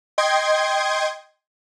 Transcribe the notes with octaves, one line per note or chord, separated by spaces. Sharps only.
D#5 G5 C6 G#6